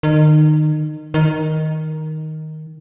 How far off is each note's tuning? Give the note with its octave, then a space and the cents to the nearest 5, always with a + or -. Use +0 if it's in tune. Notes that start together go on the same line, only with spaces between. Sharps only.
D#3 -25
D#3 +5